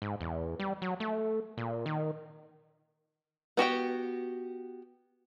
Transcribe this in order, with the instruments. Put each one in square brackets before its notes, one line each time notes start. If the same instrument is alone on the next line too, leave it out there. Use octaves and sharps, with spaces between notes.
[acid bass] G#2
E2
G3
F#3
A3
A#2
D#3
[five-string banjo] B3 F#4 G4 G5